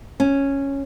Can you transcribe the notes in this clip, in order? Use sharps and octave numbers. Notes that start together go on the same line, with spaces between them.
C#4